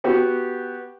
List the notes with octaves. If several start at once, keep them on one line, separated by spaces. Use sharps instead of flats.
B3 F#4 G4